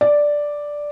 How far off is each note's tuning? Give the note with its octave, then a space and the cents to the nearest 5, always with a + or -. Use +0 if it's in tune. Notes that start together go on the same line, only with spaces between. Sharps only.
D5 +0